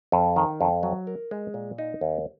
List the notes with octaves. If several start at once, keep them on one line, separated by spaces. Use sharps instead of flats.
F2
D#3
F2
F#3
A#4
G#3
A#2
D#4
D#2